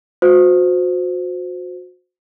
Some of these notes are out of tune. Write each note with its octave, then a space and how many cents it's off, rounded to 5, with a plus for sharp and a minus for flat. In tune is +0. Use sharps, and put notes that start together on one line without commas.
F#4 -35 C5 -20